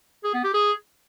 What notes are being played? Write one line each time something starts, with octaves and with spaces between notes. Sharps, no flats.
G#4
B3
G4
G#4